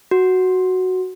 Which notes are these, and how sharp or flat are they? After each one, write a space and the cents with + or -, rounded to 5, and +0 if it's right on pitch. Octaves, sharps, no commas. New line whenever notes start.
F#4 +0